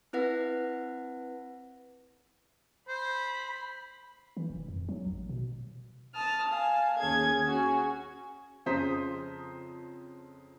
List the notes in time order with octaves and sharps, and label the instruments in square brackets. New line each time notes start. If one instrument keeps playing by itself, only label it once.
[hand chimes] C4 E4 B4 F#5 A#6
[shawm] C5 [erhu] B5
[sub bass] E3
E1
F2
F#3
A1
B2
[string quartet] A5 D#6 F6
F5 G#5 A5
D#2 C#4 G#4 G#6
C#4 F#4 G#4
[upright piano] F2 C#3 C5 A#5 D#6 B6